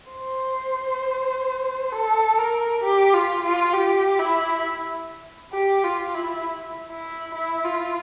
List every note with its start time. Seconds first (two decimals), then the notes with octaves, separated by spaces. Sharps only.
0.12 C5
1.93 A4
2.38 A#4
2.83 G4
3.14 F4
3.43 F4
3.73 G4
4.18 E4
5.53 G4
5.84 F4
6.14 E4
6.89 E4
7.34 E4
7.64 F4